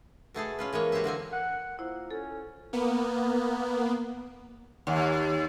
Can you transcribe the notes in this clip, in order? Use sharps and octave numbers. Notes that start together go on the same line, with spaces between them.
B2 A3 G#4 A4
C#4 F4 B4
E3 G#3 A#3 C#5
F#4 G4 C5 C#5 E5
D3 A#3 C4 G#5
F#5
A#3 E4 F4 C5
C#4 A4
A#3 B3
D#2